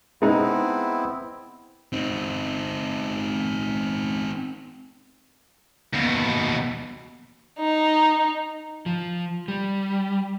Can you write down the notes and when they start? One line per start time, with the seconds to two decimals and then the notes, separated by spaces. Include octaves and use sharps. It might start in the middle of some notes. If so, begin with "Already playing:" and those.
0.22 G#3 B3 C4 D#4 E4
1.93 C4 D#4
5.93 D#2 B2
7.59 D#4
8.86 F3
9.48 G3